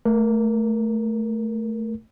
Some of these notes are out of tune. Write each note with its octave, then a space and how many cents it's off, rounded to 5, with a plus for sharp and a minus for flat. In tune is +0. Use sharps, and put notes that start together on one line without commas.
A3 +0 A#4 +15